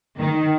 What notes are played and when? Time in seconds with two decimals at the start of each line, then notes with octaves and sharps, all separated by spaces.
0.19 D#3